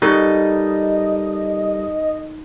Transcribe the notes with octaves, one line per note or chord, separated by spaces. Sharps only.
G3 D#4 A4 A#4 D#5